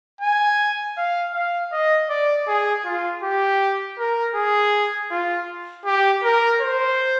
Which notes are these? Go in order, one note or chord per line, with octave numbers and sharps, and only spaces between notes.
G#5
F5
F5
D#5
D5
G#4
F4
G4
A#4
G#4
F4
G4
A#4
C5